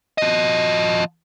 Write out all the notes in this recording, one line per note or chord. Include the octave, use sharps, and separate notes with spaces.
F3 D#5